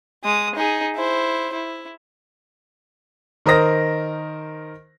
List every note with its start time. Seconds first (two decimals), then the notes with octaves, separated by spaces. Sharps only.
0.24 G#3 D#6
0.55 D#4 G#4
0.95 E4 C5
1.54 E4
3.46 D#3 A#4 C5 D#6 A#6